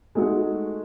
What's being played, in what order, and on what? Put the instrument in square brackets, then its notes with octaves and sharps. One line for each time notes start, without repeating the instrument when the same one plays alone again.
[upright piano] G#3 A3 D#4 F#4 G#4